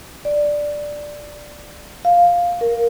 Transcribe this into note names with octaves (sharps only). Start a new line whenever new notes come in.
D5
F5
A#4